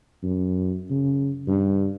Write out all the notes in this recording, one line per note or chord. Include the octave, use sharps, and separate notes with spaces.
F#2
C#3
G2